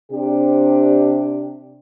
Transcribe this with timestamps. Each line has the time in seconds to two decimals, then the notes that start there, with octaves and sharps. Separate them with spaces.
0.12 C3 D4 G4